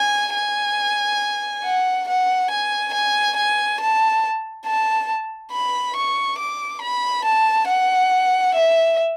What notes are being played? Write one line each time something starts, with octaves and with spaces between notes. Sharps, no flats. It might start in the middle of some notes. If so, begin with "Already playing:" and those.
Already playing: G#5
G#5
F#5
F#5
G#5
G#5
G#5
A5
A5
B5
C#6
D6
B5
A5
F#5
E5